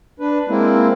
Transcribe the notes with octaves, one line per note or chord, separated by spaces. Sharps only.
D4 B4
G#3 A#3 C4 E4